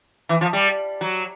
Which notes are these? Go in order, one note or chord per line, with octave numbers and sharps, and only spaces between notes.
E3
F3
G3
F#3